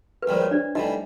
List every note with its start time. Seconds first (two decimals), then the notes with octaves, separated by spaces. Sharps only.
0.22 B4
0.28 A#1 G#2 D#3 G3 C5
0.42 C#5
0.51 D4 D5
0.75 A2 E3 G3 D#4 D#5